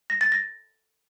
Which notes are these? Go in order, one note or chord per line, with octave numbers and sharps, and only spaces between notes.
A#6
A6
A#6